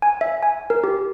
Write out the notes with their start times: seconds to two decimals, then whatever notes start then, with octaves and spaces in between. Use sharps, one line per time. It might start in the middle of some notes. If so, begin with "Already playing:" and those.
0.02 G#5
0.21 E5
0.43 G#5
0.70 A#4
0.84 G4